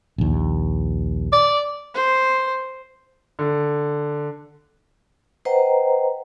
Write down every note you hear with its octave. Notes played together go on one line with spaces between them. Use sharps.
A#1 D#2
D5
C5
D3
B4 C5 D#5 F#5 G5 A#5